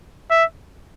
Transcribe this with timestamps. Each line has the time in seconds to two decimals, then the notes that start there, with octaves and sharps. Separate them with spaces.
0.31 E5